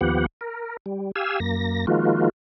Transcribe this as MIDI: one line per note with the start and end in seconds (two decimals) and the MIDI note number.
0.01 0.26 39
0.01 0.26 53
0.01 0.26 59
0.01 0.26 67
0.01 0.26 78
0.41 0.77 70
0.86 1.11 55
1.16 1.40 67
1.16 1.40 77
1.16 1.40 80
1.16 1.40 88
1.40 1.86 42
1.40 1.86 58
1.40 1.86 94
1.87 2.29 51
1.87 2.29 53
1.87 2.29 56
1.87 2.29 58
1.87 2.29 65
1.87 2.29 66